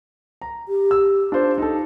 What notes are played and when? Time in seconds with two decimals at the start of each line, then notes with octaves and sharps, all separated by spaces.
0.42 A#5
0.68 G4
0.91 E6
1.32 D4 F4 C5
1.58 D#4 A4